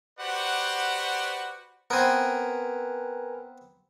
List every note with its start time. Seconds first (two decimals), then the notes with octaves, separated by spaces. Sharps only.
0.19 F#4 G4 B4 C5 D5 F#5
1.90 B3 C4 A#4 B4 G#5